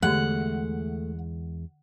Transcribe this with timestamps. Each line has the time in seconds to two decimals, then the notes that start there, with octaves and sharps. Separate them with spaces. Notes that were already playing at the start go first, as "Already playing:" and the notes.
0.03 E2 D3 G#3 A3 G4 F#5